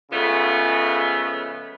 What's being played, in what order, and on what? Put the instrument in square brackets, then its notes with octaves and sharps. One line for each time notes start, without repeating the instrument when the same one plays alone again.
[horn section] C#3 F3 G#3 A3 B3